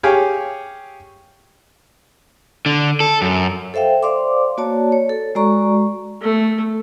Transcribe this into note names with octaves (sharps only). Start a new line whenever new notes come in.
G4 G#4 C#5 F5 G5 G#5
D3
A4
F#2
A4 C5 E5 F5 G5
C5 D5 F5 C6 D6
A#3 F#4 C#5 D5 A5
C#5
A4
G#3 F#4 D5 A#5 C#6
A3